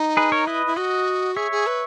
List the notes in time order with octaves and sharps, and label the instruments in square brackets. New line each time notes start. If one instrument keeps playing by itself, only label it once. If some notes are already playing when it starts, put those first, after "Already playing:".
Already playing: [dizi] D#4
[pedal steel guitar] G#4 B4
A#4 C#5
[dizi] E4 [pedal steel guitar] B4 D#5
[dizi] E4
[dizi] F#4 [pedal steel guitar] D#5 F#5
[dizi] G#4 [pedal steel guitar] C#5 E5
[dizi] G#4
B4